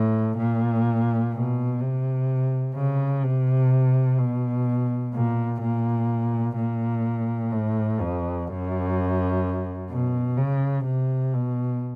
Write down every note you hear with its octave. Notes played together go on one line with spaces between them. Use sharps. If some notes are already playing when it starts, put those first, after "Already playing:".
Already playing: A2
A#2
B2
C3
C#3
C3
B2
A#2
A#2
A#2
A2
F2
F#2
B2
C#3
C3
B2